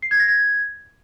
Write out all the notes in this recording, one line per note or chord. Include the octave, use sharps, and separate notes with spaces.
C7
G#6
A#6
G#6